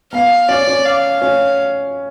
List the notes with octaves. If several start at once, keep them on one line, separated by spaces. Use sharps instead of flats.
B3 F5
C#4 D5
C#4
F5
C#4